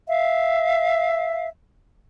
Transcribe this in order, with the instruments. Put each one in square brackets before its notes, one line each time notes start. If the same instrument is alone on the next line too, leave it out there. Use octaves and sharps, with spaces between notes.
[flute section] E5 F5